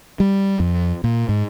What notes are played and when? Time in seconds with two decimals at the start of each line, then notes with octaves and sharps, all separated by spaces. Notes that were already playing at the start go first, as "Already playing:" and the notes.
0.20 G3
0.60 F2
1.04 A#2
1.29 G#2